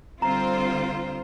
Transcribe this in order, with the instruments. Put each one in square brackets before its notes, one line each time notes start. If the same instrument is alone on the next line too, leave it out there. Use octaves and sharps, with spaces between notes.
[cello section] D3 G3 C4 F4 C5 [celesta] A#5